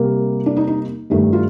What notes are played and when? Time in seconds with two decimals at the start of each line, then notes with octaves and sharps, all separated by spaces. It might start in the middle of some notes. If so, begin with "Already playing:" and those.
Already playing: C3 G3 A#3 A#4
0.46 D4
0.57 D#4
0.67 D#4
1.10 G2 D#3 A3
1.33 F4